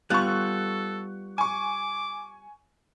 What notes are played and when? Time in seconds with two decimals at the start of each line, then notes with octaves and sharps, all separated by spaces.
0.10 G3 B3 F4 A5 C#6 F#6
0.27 A4
1.38 G#5 C#6 D6